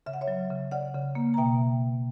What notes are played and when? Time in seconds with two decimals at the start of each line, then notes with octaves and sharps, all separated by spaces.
0.06 C#3 E5
0.13 F#5
0.21 C#5 E5
0.28 F#3
0.50 C#3
0.71 C#3 D5 F#5
0.94 C#3
1.15 A#3
1.34 A#5
1.37 B2 E5 G5